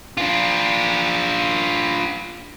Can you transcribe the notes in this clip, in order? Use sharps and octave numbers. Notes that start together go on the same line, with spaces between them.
D4 F4